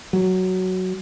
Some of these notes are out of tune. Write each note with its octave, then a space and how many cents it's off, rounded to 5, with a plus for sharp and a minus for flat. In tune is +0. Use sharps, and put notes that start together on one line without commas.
F#3 +5